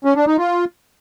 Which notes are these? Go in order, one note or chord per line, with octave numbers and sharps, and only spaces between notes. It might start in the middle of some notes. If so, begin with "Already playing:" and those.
C#4
D4
D#4
F4